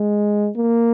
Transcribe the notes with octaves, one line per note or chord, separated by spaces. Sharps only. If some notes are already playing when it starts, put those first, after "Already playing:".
Already playing: G#3
A#3